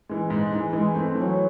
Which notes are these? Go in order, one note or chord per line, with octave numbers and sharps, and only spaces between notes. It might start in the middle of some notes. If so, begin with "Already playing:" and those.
E3 G#3
G#2
E3 G#3
E3 G#3
A3 C4
E3 F#3